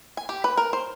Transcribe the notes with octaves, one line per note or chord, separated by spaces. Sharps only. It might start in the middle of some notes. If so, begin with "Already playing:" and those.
G#5
G4
B4
A#4
C5